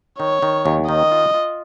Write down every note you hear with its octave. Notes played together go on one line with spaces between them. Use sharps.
D#3 C#5
D#3
D#2
D#3 D#5
F4
F4